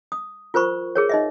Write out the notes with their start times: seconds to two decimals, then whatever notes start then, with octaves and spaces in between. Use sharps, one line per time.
0.12 D#6
0.54 F4 A#4 C5 B5 C#6
0.95 G#4 A#4 C#5
1.09 D#4 D#5 E5